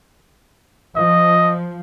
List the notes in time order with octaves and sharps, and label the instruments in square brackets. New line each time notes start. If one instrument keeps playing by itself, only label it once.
[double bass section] F3 [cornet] D#5